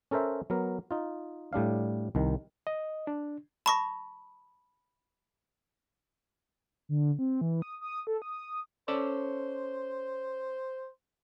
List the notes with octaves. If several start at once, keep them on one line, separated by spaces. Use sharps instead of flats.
C#4 A4 A#4 C5 E5
F#3 B3 A#4
D#4 F4
A2 G3 D4 F5
C2 D#3
D#5
D4
A5 B5 C#6 D#6 A#6
D3
C4
E3
D#6
D#6
A4
D#6
C#4 A4 C5 D5